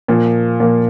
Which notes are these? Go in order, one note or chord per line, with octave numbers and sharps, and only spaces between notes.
A#2 F3 A#3
A#2 F3 A#3